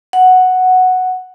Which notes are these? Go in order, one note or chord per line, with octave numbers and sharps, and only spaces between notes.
F#5